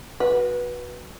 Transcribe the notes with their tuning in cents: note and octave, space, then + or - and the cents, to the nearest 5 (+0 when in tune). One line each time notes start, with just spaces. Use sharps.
F#4 +0 B4 -15